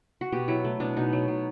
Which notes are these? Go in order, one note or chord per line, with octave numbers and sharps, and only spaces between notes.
F#4
B2 G4
F#3 E4
A3
B2 D4
B2 D#4
F#3
B2